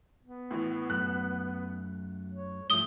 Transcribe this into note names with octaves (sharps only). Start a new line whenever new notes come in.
B3
A2 E3
F#2 A3 F#6
C#5
G2 F3 A3 D#6 G7